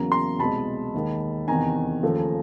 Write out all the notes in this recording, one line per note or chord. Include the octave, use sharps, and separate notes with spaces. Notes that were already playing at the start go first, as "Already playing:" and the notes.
Already playing: E2 C#3 F#3 A#3 A#5
A#5 C6
C2 B2 G#3 A5 B5
D#2 D#3 G#3
E2 C3 D#3 G#5 A#5
D#2 C#3 F3 A3